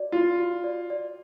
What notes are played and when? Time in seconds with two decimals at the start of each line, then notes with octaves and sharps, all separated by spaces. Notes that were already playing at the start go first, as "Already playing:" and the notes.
Already playing: F#4 D5
0.12 F4 F#4
0.39 F#4
0.64 D5
0.90 D5